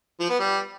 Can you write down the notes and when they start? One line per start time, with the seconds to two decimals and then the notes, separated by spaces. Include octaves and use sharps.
0.20 F3
0.30 B3
0.39 G3